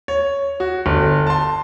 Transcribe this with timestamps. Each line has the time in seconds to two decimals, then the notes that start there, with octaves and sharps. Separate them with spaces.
0.08 C#5
0.60 F#4
0.86 G1
1.27 A5 C6